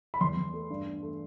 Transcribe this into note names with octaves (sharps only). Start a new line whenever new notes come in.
B5
E2 C6
E2
A3
G2
G2
A3